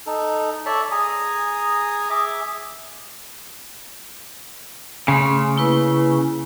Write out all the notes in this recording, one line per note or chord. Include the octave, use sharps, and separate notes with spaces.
D#4 A4
A4 C#5 D5 E5 A5
G#4 G#5 A#5 D#6
G#4 E5 D6
C#3 A3 C6 D#6
A#3 E4 B4